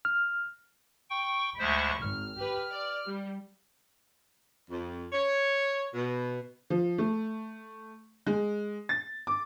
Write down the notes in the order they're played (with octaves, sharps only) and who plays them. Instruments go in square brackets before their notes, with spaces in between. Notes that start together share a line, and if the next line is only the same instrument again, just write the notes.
[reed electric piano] F6
[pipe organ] G5 C#6
[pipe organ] D2 G#3 C5 [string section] B5 C#6
[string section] G#1 [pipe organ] F6
[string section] G4 B4
D5
G3
[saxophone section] F2
C#5
B2
[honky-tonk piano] F3
A3
G#3
A6
D6